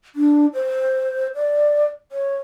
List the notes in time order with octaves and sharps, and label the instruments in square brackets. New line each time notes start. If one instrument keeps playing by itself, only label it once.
[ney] D4
C5
D5
C#5